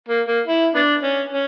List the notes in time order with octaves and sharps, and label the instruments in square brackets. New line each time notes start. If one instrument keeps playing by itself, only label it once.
[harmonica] A#3
A#3
E4
B3 D4
C#4
C#4